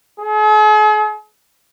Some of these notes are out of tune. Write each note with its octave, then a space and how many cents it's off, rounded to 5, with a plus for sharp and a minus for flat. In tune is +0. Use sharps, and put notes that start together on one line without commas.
G#4 +45